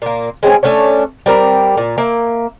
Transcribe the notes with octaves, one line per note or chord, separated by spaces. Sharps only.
A#2 A#3
G#3 C4 C#4 G#5
A3 C#4 D4 C#5
G3 C4 A#4 D5
A#2
A#3 E5